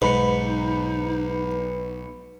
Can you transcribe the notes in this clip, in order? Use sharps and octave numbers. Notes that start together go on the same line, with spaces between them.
B1 G#2 D#4 B4 B5 C#7